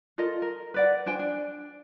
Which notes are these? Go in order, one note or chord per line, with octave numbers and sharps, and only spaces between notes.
F4 A4 A#4 D#5
A#4
B4 D5 F#5
D4 C5 G5 G#5
D4